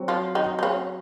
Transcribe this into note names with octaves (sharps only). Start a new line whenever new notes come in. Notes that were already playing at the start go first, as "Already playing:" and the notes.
Already playing: F#3 C4 F#4
F3 F4
D#3 D#4
D#4
C#3 C#4